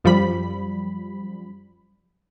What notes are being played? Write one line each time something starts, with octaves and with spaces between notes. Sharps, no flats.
F#2 F3 G3 B5